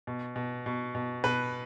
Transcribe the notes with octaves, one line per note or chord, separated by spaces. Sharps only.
B2
B2
B2
B2
B2 B4